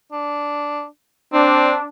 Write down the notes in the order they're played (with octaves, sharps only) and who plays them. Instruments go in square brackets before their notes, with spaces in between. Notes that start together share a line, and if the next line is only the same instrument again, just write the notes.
[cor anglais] D4
[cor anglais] C4 [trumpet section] D4